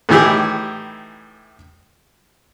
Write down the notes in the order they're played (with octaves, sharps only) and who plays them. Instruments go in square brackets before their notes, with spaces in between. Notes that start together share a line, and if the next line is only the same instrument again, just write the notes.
[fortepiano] A2 D#3 E3 E4 G4 G#4